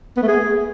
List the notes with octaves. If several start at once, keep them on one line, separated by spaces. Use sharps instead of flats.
B3
A3
G#4